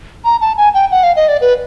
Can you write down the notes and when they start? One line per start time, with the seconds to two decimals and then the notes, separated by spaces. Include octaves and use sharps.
0.25 A#5
0.41 A5
0.57 G#5
0.74 G5
0.91 F#5
1.03 F5
1.16 D#5
1.28 D5
1.41 B4